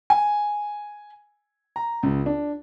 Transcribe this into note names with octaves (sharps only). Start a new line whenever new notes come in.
G#5
A#5
C#2
D4